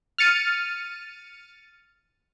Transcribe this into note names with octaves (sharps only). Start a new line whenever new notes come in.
F6 A6 C#7 D#7